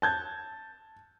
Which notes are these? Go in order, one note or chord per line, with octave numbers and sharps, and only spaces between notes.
A5 G6 G#6